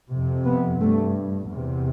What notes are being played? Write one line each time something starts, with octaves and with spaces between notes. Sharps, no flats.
F2 C3
B3
G2 A3
E2 C3